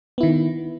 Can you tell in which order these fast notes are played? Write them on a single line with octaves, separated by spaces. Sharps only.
B3 E4 D#3